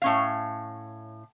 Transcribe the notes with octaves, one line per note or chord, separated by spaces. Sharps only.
A2 C#4 F5